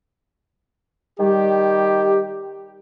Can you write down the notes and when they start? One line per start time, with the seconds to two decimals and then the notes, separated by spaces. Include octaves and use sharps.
1.20 D#3 G3 G4